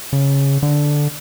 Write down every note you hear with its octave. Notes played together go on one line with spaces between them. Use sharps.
C#3
D3